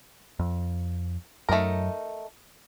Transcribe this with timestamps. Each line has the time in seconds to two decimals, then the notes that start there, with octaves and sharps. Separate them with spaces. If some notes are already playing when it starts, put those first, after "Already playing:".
0.39 F2
1.49 F#2 A3 D#4 A#4